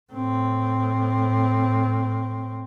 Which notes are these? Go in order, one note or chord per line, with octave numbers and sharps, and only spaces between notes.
A2 C4